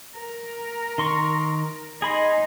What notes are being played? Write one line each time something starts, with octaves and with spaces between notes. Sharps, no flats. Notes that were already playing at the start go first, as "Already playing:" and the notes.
A#4
D#3 C6 C#6
D#4 G#4 D#5 B5 C6